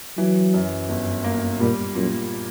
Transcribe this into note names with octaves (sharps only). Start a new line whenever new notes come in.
E3 F#3
F#2
G1
A#3
A#2 G3
F#2 A#2